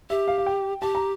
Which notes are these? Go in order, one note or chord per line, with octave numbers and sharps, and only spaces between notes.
G4 E5
F5
F5
G5
G4 A5
A#5